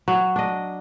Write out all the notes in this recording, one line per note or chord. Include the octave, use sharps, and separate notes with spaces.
F#3
D4 D#5